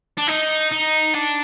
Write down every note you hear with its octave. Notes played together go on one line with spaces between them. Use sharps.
D4
D#4
D#4
D4